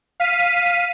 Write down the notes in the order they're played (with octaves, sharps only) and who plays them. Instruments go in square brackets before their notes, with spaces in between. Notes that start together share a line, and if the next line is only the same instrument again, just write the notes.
[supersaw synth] F5 B6 D#7